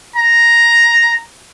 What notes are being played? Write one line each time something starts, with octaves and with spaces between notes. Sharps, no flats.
A#5